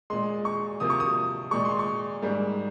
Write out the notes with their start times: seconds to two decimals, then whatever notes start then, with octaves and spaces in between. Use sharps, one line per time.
0.10 A#2 G#3 C6
0.45 C#6
0.80 C3 F3 A#3 D#6
0.90 C#6
1.00 D#6
1.51 A#2 G#3 C#6
1.65 C6
1.79 C#6
2.22 G#2 G3 A#3